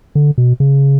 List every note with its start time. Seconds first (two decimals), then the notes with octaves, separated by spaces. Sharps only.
0.15 D3
0.38 B2
0.60 C#3